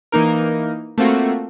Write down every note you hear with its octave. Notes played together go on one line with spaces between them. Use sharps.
E3 A#3 D#4 A#4
A3 A#3 C4 F4 F#4